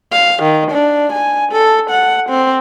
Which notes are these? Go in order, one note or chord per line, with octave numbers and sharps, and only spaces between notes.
F5
D#3
D4
G#5
A4
F#5
C4